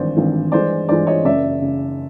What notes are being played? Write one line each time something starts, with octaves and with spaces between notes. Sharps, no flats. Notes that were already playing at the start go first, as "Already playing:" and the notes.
Already playing: G#1 G2 E3 C5 D5
G#1 G2 E3
G2 E3 G#3 C5 D5
G2 E3 G#3 C5 D5
C#5 D#5
F#1 F#2 C#3 D5 E5
C#3